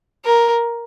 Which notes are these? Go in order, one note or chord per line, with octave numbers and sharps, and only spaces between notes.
A#4